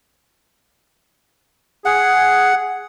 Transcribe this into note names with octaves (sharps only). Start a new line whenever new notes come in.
G#4 F#5